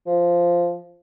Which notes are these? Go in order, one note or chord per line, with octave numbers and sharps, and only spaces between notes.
F3